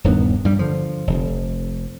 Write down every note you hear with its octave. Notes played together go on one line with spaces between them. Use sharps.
D#1 G2 D#3 B3
G2 G3
D3 F3
F1 F2